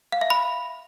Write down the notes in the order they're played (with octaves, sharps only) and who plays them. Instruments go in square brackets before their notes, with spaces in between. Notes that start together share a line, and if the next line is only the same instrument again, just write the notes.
[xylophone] F5
E5
B5